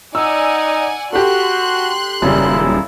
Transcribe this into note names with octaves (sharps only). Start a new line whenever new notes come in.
D#4 D5 F#5 G#5 E6
F#4 G4 A4 C6 F#6
D#1 F#2 C#3 G3 E4